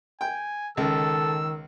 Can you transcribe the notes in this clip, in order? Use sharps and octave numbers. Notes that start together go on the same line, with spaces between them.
G5 G#5
C#2 D#3 A4 E6